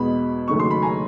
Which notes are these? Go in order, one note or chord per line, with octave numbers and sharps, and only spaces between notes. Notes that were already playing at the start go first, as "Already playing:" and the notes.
Already playing: E2 B2 G#3 B5
F#1 F#2 D#3 F#3 A3 C#6
C6
B5
G#5 A#5